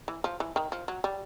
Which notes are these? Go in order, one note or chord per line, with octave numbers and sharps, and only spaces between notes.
E3
F3
E3
D#3
F3
F#3
G3